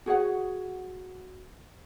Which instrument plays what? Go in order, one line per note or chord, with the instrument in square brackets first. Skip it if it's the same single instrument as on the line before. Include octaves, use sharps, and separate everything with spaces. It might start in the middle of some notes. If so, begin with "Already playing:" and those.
[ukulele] F#4 G#4 C#5 F#5